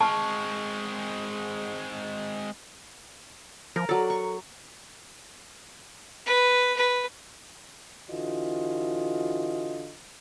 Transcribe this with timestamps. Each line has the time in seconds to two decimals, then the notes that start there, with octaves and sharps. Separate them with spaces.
0.01 G#3 C4 A5 C#6 F6
3.76 F3 A#4
3.89 F#3 A4 D5
4.10 C#6
6.26 B4
6.76 B4
8.09 D3 E3 F4 F#4 D#5